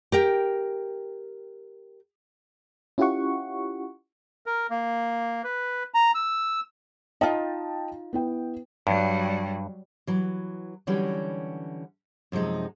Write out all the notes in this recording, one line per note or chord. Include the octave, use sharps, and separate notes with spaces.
G4 A#4 G5
C#4 E4 F4 G4 F#5 C#6
A#4
A#3
B4
A#5
E6
D#4 F4 D#5 G5 A5
B3 E4 G5
G2 F#3 G3
E3 F#3
D3 E3 F#3 G3 C#4 F#4
F#2 C3 F3 G#3 D#4